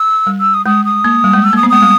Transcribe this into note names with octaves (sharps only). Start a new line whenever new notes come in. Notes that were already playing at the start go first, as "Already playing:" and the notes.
Already playing: E6
G3
E6
D#6
G#3 D#6
D#6
A#3
G3
G#3
E6
A#3
D#6
B3
G#3 D#6
G3